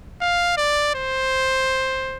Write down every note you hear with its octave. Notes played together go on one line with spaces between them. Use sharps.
F5
D5
C5